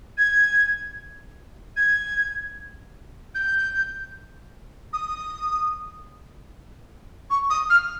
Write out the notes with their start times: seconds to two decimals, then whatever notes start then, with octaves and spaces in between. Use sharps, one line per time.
0.17 G#6
1.76 G#6
3.34 G6
4.93 D#6
7.30 C#6
7.50 D#6
7.70 F6